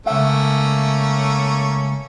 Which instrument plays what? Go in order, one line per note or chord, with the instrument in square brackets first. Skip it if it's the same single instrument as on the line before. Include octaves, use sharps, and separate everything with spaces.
[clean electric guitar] C#2 E5 [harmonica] A3 A#3 C#4